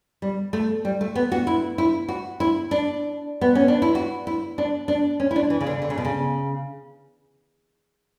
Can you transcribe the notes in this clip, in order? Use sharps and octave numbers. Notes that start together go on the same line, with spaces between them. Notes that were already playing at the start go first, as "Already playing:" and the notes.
G3
A3
G3
A3
B3
F#4
E4
E4
F#4
E4
D4
B3
C#4
D4
E4
F#4
E4
D4
D4
C#4
E4
D4
E3
C#3
D3
D3
C#3
B2
C#3